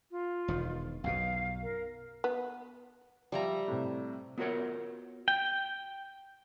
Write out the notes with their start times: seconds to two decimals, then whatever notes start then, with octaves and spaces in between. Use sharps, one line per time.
0.11 F4
0.48 E1 D#3
1.04 B1 F#2 B2 F5
1.63 A#4
2.24 B3
3.32 F3 G3 E5 A#5
3.68 A2 C3
4.38 B3 F4 F#4 A#4 C#5 F#5
5.28 G5